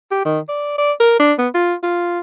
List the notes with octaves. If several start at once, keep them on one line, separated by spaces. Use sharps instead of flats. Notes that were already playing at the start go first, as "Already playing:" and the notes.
G4
D#3
D5
D5
A#4
D4
B3
F4
F4